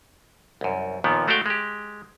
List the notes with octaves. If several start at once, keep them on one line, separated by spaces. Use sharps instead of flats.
C2 F#2
D#2 A#2 D#3 F3 B3
G#3 A3 F#4 D5 F5 G5
G#3 G4